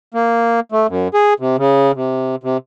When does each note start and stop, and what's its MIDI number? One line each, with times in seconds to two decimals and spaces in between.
0.14 0.60 58
0.72 0.87 57
0.89 1.08 42
1.14 1.34 68
1.40 1.56 48
1.58 1.92 49
1.95 2.36 48
2.43 2.57 48